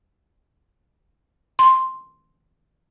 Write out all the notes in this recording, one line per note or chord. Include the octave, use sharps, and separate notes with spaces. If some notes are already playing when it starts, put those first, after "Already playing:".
C6